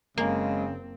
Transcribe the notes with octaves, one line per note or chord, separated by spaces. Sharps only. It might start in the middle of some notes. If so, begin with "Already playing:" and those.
F#1 C#3 G#3 A#3 C4